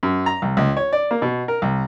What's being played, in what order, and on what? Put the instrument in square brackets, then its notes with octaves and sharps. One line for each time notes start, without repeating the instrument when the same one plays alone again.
[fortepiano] F#2
A#5
C2
C#2
C#5
D5
A#3
B2
A#4
C2